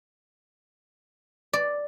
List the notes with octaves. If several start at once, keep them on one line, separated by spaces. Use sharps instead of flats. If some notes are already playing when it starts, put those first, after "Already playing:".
D5